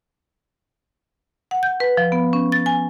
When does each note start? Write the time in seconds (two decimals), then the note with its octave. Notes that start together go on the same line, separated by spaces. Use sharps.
1.51 F#5
1.63 G6
1.80 B4
1.97 F3
2.12 B3
2.33 C#4
2.52 A6
2.66 G#5